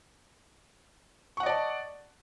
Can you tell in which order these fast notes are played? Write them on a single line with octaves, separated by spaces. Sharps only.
C#6 F#5 D#5 D5 A5